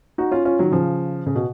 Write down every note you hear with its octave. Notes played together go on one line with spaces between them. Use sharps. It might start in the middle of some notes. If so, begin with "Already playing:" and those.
D#4 F#4
C#4 F4
C#4 F4
D#3 F#3
C#3 F3
C#3
B2